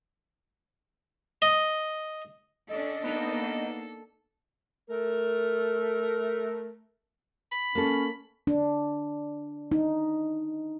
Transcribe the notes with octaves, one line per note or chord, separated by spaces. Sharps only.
D#5
C#4 D4 A4 D#5
A#3 B3 D4 D#4 A4
A3 A#4
B5
A#3 C#4 A4
D4
D#4